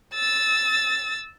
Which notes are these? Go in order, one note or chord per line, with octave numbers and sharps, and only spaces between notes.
E6 A6